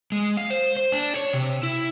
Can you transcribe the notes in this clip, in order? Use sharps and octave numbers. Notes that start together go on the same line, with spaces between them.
G#3
F5
C5
C5
D4
C#5
C3
E4